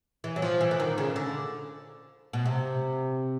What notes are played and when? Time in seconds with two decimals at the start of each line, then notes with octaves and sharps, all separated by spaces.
0.24 E3
0.36 F#3
0.42 F3
0.61 E3
0.71 D3
0.80 D#3
0.98 C#3
1.16 D3
2.33 B2
2.46 C3